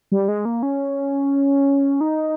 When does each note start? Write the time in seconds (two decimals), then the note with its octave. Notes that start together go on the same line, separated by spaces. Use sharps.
0.12 G3
0.28 G#3
0.45 A#3
0.63 C#4
2.01 D#4